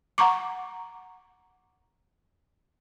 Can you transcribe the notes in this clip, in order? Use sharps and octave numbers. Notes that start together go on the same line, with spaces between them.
F#5 A#5 C#6 D6